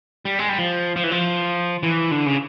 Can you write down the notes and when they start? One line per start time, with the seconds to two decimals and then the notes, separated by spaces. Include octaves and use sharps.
0.25 G3
0.39 G#3
0.49 G3
0.59 F3
0.96 F3
1.04 E3
1.11 F3
1.83 E3
2.11 D3
2.26 C#3